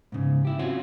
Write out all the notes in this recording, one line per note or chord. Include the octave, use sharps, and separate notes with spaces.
G#2 C#3
E4 G4
C4 C#4 F4 F#4